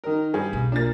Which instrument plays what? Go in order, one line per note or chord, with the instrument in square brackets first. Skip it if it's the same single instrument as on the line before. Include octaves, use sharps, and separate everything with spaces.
[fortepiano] D#3 A#4
[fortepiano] G2 [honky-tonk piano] G#4
[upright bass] B1
[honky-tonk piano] A#2 A6 [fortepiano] D4 A#4